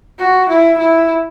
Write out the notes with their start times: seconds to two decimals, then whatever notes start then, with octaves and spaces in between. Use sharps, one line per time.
0.19 F#4
0.49 E4
0.78 E4